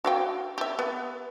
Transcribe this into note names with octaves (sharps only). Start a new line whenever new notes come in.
F#4 F5 G5
G4 E5
B3